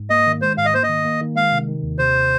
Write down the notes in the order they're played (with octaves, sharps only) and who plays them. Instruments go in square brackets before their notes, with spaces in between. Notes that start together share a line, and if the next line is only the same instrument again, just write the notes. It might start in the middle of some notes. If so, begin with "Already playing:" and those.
Already playing: [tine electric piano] G#2
[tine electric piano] A#3 [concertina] D#5
[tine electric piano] D#3
[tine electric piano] G#3 [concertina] C5
[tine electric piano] G#2 [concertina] F5
[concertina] D#5
[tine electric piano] A#3 [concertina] C5
[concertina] D#5
[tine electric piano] D#3
A#3
D#3
[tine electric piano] G#3 [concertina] F5
[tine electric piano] C3
D#3
D#2
[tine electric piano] C3 [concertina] C5